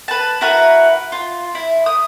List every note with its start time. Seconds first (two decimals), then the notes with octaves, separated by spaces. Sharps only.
0.08 B4 A5
0.41 E4 F#4 A#4 B4
1.12 F4
1.55 E4
1.86 D#6